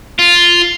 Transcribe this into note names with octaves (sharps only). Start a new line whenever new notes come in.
F4